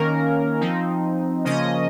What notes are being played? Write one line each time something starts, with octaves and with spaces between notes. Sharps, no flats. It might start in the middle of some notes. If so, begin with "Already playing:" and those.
Already playing: D#3 A#3 C#4 A#4
F3 C4 D#4
C#3 F3 A#3 C#4 D#5